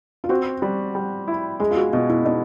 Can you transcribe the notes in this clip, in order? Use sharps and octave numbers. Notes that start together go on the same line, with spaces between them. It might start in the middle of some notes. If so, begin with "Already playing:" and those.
F4
C4 F#4
G3 G4
G3
E4
G#3 G#4
F4
F#4
B2 F4
E4
B2 D#4